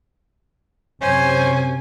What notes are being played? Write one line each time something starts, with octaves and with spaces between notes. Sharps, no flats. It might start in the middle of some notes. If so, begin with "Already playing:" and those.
F#2 C3 C#4 C5 G#5